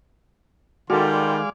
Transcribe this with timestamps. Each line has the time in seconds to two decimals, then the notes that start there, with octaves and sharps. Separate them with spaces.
0.90 D#3 G3 G#3 F4 F#4 A4 D5 F5